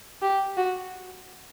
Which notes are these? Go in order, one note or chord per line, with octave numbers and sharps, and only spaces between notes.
G4
F#4